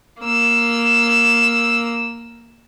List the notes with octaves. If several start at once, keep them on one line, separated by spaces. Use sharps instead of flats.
A#3 E6